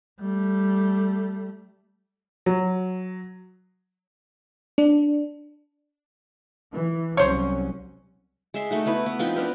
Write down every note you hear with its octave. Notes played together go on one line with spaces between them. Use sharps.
G3 A3
F#3
D4
E3
C2 F#3 C#4 C5 C#5
G#3 E5 C6
A3 D#4 F#4
B3 E4 B4
B3
F3 C4 D#4 B4
B3 D4 A#4 B4